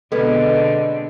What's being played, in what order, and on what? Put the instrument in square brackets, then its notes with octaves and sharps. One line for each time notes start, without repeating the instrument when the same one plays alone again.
[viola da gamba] B2 D3 C4 [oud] G#3 B3 [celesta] A4 B4